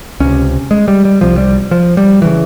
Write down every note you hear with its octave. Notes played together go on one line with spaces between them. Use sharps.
C#2 C3 C#4
G#3
G3
G3
C2 C3 F3
G3
F3
G3
C#3 E3